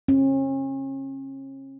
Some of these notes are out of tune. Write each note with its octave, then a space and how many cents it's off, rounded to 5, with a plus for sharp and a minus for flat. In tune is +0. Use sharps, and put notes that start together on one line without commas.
C#4 -40